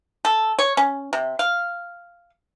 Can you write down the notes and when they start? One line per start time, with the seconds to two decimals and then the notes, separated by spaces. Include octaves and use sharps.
0.25 A4
0.59 C#5
0.77 C#4
1.13 C3
1.39 F5